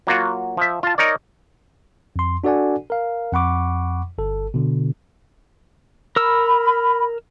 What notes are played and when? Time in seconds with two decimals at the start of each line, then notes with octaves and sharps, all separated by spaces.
0.07 F#3 A#3 F4 F#4
0.57 F3 E5
0.83 F4 A5
0.98 D#4 A#4 C#5 D5
2.16 F2 C6
2.44 D4 F#4 A4 D5 F#5 G#5
2.90 A#4 F5
3.33 F2 F#5 B5 C#6 D6
4.18 G1 A4
4.54 B2 D3
6.16 A#4 B5 E6